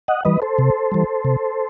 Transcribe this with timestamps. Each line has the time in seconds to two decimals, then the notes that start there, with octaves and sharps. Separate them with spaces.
0.08 D#5 F#5
0.25 E3 G3 B4 D#5
0.42 A4 C5
0.58 C3
0.92 E3 G3
1.25 C3